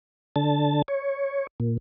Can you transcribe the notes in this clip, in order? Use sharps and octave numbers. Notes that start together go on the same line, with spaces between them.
D3 A5
C#5
A#2